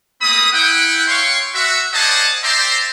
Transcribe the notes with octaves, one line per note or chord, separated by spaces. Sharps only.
A3 A#3 C4 B5 D#6
E4 F#5 G5
C#5 F5 G5 C6 C#6
F#4 E5
C5 D5 D#5 F#5 G#5 A5
C5 D5 E5 G5 A#5 C6